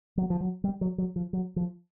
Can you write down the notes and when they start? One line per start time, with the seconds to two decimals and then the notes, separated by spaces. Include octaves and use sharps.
0.18 F#3
0.30 F3
0.41 F#3
0.64 G3
0.81 F#3
0.98 F#3
1.16 F3
1.33 F#3
1.56 F3